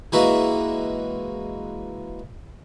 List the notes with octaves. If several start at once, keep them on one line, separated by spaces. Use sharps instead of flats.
E3 G#3 A#3 F#4 E5